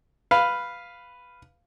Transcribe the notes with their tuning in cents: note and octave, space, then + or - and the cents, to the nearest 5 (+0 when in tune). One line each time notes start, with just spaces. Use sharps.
B4 +0 F5 +0